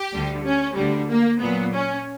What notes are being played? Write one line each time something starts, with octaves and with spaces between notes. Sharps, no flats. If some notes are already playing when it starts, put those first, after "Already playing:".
Already playing: G4
D2 D3 G3
C#4
D2 D3 G3
A#3
A#2 F#3 B3
C#4